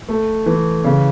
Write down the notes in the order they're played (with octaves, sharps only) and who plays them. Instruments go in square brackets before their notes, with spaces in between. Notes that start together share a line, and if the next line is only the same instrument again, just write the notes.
[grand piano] A3
E3
C#3